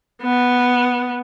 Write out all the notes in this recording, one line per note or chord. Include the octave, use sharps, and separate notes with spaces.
B3